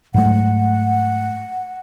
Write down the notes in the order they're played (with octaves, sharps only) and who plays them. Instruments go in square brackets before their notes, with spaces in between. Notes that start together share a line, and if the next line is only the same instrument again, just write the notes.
[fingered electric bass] G#2 F#3 A3 [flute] F#5